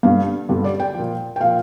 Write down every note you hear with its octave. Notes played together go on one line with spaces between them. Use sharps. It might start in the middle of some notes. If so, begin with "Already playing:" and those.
G2 D3 G3 F5
G2 D3 G3
D5
G5
A#2 F3
G5
A#2 F3 F5